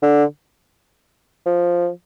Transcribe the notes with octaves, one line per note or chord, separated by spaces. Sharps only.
D3
F3